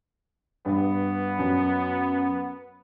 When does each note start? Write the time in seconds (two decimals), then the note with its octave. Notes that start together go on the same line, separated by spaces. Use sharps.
0.66 G2 B3
1.39 F#2